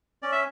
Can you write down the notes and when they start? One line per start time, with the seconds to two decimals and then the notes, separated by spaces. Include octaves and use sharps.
0.22 C#4 D5
0.32 E5